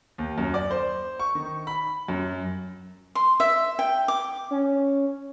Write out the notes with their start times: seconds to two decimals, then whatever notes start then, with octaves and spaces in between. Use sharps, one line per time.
0.18 D#2
0.38 F#2
0.54 D5
0.71 C5
1.19 C#6
1.35 D#3
1.67 B5
2.08 F#2
3.15 C6
3.40 E5
3.79 G5
4.08 D6
4.51 C#4